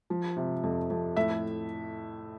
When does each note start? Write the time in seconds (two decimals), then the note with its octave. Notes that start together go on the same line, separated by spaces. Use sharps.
0.10 F3
0.37 C3
0.63 F2
0.90 F2
1.16 A2 E5